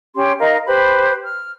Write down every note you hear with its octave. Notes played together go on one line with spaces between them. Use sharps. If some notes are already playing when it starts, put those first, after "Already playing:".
C#4 G4 C6
D#4 A#4 D#5 F5
G4 B4 C5 B5
F6